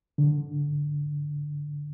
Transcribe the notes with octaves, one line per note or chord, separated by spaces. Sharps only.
D3